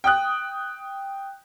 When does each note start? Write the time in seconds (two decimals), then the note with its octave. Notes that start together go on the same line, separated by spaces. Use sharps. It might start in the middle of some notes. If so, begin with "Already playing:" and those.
0.04 G5 D#6 F#6